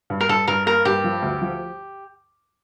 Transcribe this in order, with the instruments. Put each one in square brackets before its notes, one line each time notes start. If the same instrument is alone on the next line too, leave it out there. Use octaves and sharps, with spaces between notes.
[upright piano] G2
[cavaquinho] A#4
[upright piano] G2 [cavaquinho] A4
[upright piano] G2 [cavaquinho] A#4
[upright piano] A#3 [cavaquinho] A#4
[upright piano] G2 [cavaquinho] G4
[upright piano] F3
D2
F3